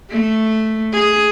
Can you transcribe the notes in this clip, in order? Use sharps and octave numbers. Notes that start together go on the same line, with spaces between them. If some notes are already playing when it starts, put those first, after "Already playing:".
A3
G#4